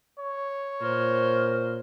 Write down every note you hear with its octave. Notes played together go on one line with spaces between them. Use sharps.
C#5
A#2 A#4 C5